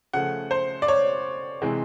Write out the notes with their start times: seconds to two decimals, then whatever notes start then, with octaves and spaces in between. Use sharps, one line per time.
0.13 C#3 F3 A3 F#5
0.51 C5
0.82 D5
0.88 C#5
1.62 C3 E3 G#3 C4